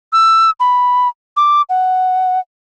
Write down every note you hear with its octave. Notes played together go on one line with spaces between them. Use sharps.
E6
B5
D6
F#5